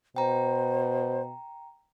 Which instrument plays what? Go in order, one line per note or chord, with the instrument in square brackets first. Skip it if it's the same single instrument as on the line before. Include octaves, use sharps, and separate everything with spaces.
[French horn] B2 [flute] C5 [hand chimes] G5 A#5